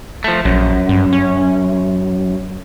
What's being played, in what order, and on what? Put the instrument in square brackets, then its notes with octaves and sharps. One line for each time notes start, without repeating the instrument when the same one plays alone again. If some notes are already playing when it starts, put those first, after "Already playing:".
[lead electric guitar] F3 A3
[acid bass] A#1 [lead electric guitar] F#2
[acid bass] G2
C#4